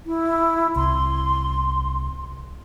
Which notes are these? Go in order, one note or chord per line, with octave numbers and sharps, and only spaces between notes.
E4
C2 C6